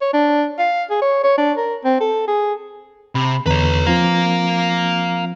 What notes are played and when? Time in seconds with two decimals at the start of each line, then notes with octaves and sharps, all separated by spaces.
0.01 C#5
0.13 D4
0.59 F5
0.90 G#4
1.01 C#5
1.24 C#5
1.38 D4
1.57 A#4
1.84 C4
2.01 A4
2.27 G#4
3.15 C3 B5
3.46 E2 D3 B4 C#5 A#5
3.87 F3 C4 F4 F5 A#5